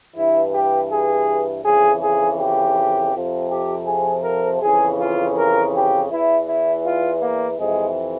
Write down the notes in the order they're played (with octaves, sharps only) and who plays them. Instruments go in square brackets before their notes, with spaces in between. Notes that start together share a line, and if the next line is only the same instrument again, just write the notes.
[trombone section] G2 E3 E4
G4
G#4
F2 C#3 E3 G#4
G#4
G4
F2 C3 F3
G4
G#4
A#4
F2 C#3 E3 G#4
F4
A#4
G4
E2 E3 E4
E4
F4
A#3
F2 C3 E3 G#3